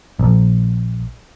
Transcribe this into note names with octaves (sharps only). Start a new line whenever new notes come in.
A#1